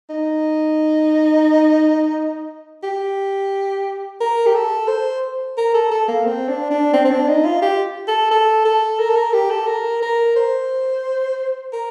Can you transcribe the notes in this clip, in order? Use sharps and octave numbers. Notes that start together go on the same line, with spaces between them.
D#4
G4
A#4
G4
A4
C5
A#4
A4
A4
A#3
C4
D4
D4
C4
C4
D4
D#4
F4
G4
A4
A4
A4
A#4
A4
A#4
G4
A4
A#4
A#4
C5
A#4